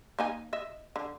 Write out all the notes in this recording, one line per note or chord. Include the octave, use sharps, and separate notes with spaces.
A#3 D#4 G#5
D#5 E5
D3